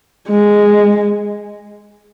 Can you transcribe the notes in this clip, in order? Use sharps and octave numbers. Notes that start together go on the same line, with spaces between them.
G#3